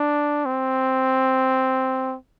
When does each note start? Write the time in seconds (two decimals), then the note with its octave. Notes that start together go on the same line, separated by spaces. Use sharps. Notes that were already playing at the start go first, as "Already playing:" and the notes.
Already playing: D4
0.45 C4